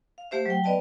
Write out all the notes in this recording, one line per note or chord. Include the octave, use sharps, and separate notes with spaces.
F5
A3 G4 C5 E5
F#3 G5
B3 B4 D5 D#5 F5 A5